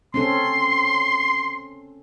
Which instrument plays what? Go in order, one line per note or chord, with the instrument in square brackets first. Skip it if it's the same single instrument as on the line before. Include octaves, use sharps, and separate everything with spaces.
[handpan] C4 C#4 A4 [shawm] C6